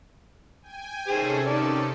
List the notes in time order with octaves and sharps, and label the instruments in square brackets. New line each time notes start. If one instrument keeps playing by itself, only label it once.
[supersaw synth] G5 G#5
[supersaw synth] C3 C#4 A4 [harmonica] D#3 G#4 C5
[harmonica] D#3 D5